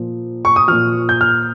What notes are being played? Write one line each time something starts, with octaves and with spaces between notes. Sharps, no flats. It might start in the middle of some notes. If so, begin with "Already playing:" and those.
Already playing: A#2 F3
C#6
D#6
A#2 F3 F6
G6
F6